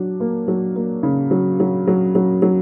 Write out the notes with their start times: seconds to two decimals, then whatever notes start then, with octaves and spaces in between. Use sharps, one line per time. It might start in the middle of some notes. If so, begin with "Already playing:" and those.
Already playing: F#3 D4
0.20 A#3
0.48 F#3
0.76 A#3
1.03 C#3
1.31 F#3
1.60 F#3
1.87 F#3
2.15 F#3
2.42 F#3